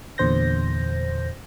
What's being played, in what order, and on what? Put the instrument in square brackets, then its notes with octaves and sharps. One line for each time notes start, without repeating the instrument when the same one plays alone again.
[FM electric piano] E2 A#2 D3 C5 G6 A#6